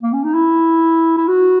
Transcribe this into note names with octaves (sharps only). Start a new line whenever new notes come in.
A#3
C#4
D#4
E4
E4
F#4